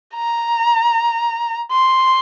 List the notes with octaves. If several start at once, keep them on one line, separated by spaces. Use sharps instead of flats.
A#5
C6